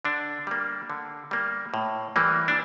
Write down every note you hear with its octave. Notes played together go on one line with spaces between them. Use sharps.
D3 D4
G3 A#3
D3
G3 A#3
A2
E3 G3 A#3
D4